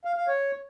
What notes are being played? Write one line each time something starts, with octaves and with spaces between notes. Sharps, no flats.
F5
F5
C#5